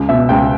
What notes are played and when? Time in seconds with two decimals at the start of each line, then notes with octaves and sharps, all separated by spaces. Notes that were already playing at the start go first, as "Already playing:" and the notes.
Already playing: C#2
0.09 B2 E5
0.29 C#2 G5